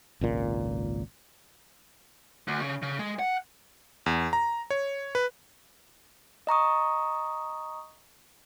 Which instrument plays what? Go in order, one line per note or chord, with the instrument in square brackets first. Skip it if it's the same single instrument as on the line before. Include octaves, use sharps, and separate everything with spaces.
[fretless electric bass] G#1 C#2 A#2
[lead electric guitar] D2
C#3
C#3
G#3
F#5
[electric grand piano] E2
A#5
C#5
B4
[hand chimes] D#5 A#5 C#6 D#6